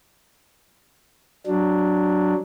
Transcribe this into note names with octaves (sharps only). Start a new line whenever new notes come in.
F#3 D4